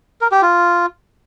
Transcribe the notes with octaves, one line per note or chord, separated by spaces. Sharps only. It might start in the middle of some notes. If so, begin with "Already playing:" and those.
A#4
G4
F4